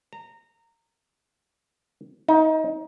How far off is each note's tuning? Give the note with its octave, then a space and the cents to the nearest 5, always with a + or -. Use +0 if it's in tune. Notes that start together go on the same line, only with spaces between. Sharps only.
A#5 -20
D#4 +25